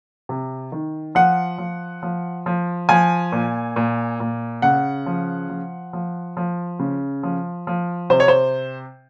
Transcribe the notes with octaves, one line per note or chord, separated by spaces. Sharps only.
C3
D#3
F3 F#5
F3
F3
F3
F3 G#5
A#2
A#2
A#2
C#3 F#5
F3
F3
F3
F3
C#3
F3
F3
C3 C5
C#5
C5